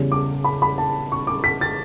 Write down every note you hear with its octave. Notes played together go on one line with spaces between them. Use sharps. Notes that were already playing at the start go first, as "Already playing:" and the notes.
Already playing: E2 C#3 G3
D6
B5
B5
A5
C#6
D6
B6
A6